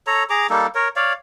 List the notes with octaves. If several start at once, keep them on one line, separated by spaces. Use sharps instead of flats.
A4 C#5 A#5
G#4 A#5 D6
G3 A#3 D#4 A4
A#4 C#5
C#5 D5 F5